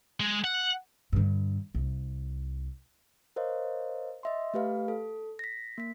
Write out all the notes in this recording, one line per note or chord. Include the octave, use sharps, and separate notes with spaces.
G#3
F#5
G2 D3
C2
A#4 C5 C#5 D#5 F5
D#5 E5 C6
A3 G4 B4 F5
A4
A#6 B6
A#3 B6